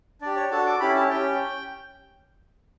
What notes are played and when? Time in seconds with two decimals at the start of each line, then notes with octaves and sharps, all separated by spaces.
0.21 D4 G4 D5
0.36 C#5
0.51 D4 F#4 A4 A5
0.66 D6
0.80 C#4 E4 G4 B5
0.96 A5
1.10 C#4 G4 G5